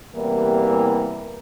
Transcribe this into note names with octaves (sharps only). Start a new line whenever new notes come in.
E2 C3 E3 G3 A#3